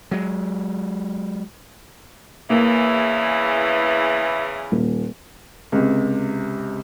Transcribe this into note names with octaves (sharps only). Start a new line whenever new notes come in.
F#3 G#3
E2 C#3 E3 A#3
D#1
C#2 C3